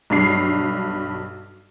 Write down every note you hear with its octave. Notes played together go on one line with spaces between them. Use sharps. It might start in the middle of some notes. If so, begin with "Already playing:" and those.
B1 G2 C7